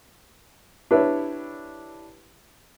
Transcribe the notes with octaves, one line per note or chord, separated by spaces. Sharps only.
D4 E4 G4 B4 C#5 E5